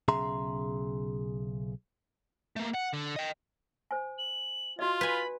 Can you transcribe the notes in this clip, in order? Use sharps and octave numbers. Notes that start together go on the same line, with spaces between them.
B1 C#3 G#4 E5 A#5 C6
A3 A#3
F#5
D3
D#5 G5
C5 G#5
F#7
F4 F#4 D5 D#5
B4 G#5 B5